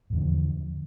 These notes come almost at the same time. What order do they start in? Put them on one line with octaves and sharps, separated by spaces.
A2 E2 D3 F3